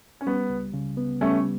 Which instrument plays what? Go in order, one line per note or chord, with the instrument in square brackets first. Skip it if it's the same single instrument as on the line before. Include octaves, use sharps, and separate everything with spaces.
[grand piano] C#4
[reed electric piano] G3 [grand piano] B3
[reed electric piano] C#2
C#3
B3
[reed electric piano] G3 [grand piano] A3 C#4